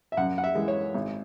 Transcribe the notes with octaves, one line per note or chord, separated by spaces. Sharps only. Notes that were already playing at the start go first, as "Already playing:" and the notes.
E5
F#2 F#5
F#5
E5
E3 G#3
C#5
G#1